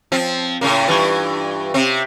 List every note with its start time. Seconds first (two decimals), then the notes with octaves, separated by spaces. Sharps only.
0.12 F3 C4
0.61 A2 C#3 A#3
0.87 G2 E3 F4
1.74 C3 C4